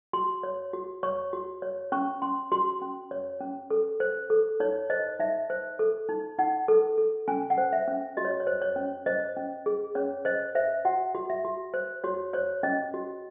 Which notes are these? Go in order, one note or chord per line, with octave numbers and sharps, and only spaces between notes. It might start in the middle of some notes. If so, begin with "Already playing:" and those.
F#4 C6
C#5
F#4
C#5 C#6
F#4
C#5
C#4 C#6
C#4 C6
F#4 C6
C#4
C#5
C#4
A4
C5
A4
D#4 C#5
C5 D#5
D#4 E5
C5
A4
D#4
D#4 F#5
A4
A4
C#4 G#5
F#5
C5
E5
C#4
F#4 D#5
C#5
C#5
C5
C#5
C#4
C5 D#5
C#4
G#4
C#4 C#5
C5 D#5
C5 E5
F#4 F#5
F#4
E5
F#4
C5
F#4 C#5
C5 C#5
C#4 D#5
F#4